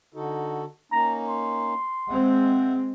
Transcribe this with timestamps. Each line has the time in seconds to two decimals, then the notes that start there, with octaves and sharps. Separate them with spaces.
0.15 D3 D#4 F#4 A4
0.92 A#3 C#4 D#4 A#5
1.28 C6
2.08 G#3 C4 E5 F#5